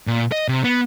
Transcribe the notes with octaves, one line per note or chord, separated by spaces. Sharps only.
A#2
D#5
C3
B3